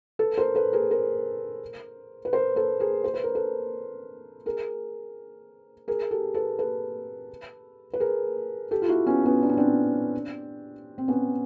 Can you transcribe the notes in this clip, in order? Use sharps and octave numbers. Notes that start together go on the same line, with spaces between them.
A4 B4
A#4 C5
A4 B4
G#4 A#4
A#4 C5
B4
A#4 C5
A4 B4
G#4 A#4
C5
B4
A#4
A4 B4
G#4 A#4
G#4 A#4
G4 A4
A4 B4
A4 B4
B4
G#4 A#4
G4 A4
F4
E4 F#4
B3 C#4
B3 C#4
D4
C#4
C4 D4
C4
B3 C#4